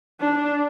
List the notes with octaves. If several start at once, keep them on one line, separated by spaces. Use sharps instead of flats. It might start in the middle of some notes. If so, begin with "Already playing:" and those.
D4